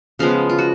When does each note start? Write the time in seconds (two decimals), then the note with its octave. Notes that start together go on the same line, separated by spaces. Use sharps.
0.19 C#3 F3 G#3 B3 F5
0.50 F4
0.58 F#4